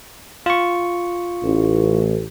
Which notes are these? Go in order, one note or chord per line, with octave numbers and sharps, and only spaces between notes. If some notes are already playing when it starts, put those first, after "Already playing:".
F4 C#6
A1